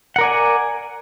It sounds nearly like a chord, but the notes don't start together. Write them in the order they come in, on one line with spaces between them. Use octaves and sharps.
F#5 A#4 D5 G#5